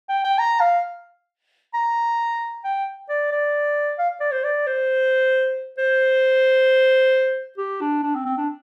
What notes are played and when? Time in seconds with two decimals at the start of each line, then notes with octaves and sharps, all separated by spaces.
0.09 G5
0.24 G5
0.39 A#5
0.61 F5
1.74 A#5
2.64 G5
3.09 D5
3.32 D5
3.98 F5
4.20 D5
4.32 C5
4.44 D5
4.67 C5
5.78 C5
7.58 G4
7.81 D4
8.03 D4
8.15 C4
8.25 C4
8.38 D4